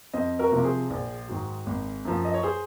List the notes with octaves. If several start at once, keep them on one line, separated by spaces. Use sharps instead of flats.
F2 C5 D#5
F#4 A#4
C3 F3
G#4 C5
A#1
G#2 D#3 F#3
G#1
F#2 F3
D#5
C#5
G#4 C5